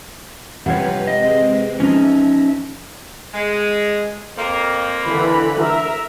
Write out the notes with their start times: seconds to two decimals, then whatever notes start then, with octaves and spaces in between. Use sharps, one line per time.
0.66 G2 C3 E3 F3 B4 C#5 F5 F#5
1.07 G#3 C4 D#5
1.80 F3 C#4 D#4 E5
3.34 G#3
4.37 F2 A#3
5.07 D3 E3 B5
5.61 A#4 E5